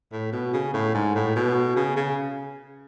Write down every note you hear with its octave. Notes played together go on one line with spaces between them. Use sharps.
A2
B2
C#3
A2
G#2
A2
B2
C#3
C#3